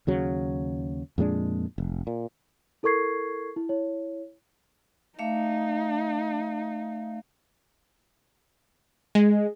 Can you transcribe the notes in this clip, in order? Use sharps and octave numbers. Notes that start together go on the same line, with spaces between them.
D#2 C#3 F#3
F2 A#2 G#3 D4
F1
A#2
E4 A4 A#4 C#6 G#6 C7
E4
E4 C#5
A3 D#4 E5 F5
G#3